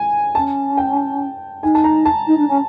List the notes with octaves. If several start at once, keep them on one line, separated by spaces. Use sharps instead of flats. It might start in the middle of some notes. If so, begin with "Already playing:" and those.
Already playing: G#5
C#4 A5
G5
D#4 G#5
A5
A#5
A5
D#4
D4
C#4